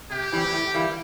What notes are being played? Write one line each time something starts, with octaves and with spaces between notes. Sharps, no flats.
C3 G4
E3 G3 C4
A2
E3 G3 A#3 E4